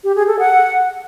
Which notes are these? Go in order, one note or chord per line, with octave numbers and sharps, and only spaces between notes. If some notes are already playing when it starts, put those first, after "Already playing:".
G4
G#4
A4
F#5